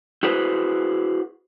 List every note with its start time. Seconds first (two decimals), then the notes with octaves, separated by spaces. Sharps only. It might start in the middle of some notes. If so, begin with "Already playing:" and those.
0.23 E4 F#4 G#4 B4 C5